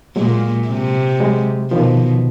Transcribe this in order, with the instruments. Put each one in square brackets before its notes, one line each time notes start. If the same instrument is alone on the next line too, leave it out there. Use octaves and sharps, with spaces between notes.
[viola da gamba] A#2 [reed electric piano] F#3 G#3
[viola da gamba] C3
[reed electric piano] F#3 G#3
[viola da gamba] B2 [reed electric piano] D#3 F3